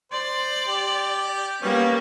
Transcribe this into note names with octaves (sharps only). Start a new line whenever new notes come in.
C5 D5
G4
G3 A#3 B3 C#4